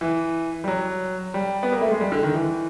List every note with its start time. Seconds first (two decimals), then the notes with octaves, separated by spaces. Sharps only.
0.01 E3
0.64 G3
0.68 F#3
1.34 G3
1.63 B3
1.72 A#3
1.81 A3
1.91 G#3
2.01 G3
2.12 D3
2.23 D#3
2.34 E3